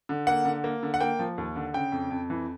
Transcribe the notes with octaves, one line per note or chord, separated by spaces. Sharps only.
D3
A#3 F#5
D3
A#3
D3
F#5
A#3 G5
F3
D#2
D3
C#3 G5
F2
F2
E3